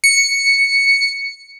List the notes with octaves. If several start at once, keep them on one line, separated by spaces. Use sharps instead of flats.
C#7